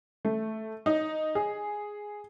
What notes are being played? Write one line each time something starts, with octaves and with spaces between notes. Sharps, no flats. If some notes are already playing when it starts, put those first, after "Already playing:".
A3
D#4
G#4